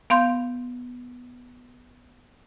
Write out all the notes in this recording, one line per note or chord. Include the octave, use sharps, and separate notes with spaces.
B3 F5 C6 G6